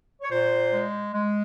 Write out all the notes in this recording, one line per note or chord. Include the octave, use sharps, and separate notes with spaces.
C#5
A#2 C5
G#3
G#3